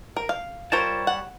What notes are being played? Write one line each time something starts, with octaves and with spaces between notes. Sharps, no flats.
A#4
F5
G3 F4 A#4 C5 C#5 A5
F#5